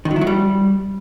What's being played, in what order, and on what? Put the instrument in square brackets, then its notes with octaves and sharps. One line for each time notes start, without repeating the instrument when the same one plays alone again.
[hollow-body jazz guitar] D#3
F#3
E4
F#3
G3